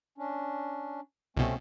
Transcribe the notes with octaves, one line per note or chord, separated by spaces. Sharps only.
C#4 D4
C2 B2 A3 C4 C#4